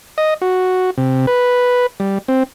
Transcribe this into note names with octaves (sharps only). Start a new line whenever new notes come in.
D#5
F#4
C3
B4
G3
C4